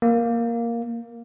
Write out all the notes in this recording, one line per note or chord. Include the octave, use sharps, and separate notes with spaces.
A#3